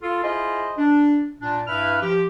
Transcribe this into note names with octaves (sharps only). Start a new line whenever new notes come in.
F4 A4
E4 F4 G#4 C5 D#5
D4
A#2 D4
G2 E4 B4 F6
F3 G4